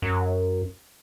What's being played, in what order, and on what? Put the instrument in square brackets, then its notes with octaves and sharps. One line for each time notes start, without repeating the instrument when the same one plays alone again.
[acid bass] F#2